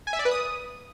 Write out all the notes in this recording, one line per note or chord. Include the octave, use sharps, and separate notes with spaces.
G#5
E5
D5
B4
D#6